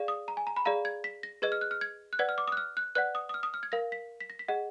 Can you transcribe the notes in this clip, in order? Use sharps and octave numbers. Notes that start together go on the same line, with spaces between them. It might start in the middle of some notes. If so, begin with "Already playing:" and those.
Already playing: G#4 D5 F5
D#6
A#5
G#5
A#5
B5
G#4 D5 F5 A#5
G#6
B6
A#6
G#4 B4 D#5 G#6
F6
F#6
F6
G#6
F#6
B4 D5 F#5 G#6
F6
D6
D#6
F#6
F6
F#6
B4 D5 F#5 F#6
D#6
D#6
F6
D#6
F6
G#6
A#4 F5 A#6
B6
B6
A#6
B6
G#4 D#5 F#5